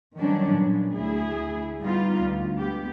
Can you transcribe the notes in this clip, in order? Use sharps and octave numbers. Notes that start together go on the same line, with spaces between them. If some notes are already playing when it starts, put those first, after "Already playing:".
D#3 F#3 G3 B3 C#4 D4
A#2 B3
D2 E4 G#4
G3 B3 D#4 F4
D2
G#3 B3 G4